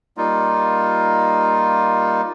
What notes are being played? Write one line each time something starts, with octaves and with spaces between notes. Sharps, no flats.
G3 A#3 D#4 F4